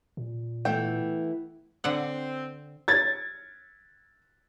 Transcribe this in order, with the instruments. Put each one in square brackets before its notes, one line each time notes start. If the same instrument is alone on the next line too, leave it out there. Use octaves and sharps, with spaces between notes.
[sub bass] A#2
[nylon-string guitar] E3 A3 B3 [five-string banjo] G5
[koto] D3 F#5 [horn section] C4
[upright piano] G#6 A6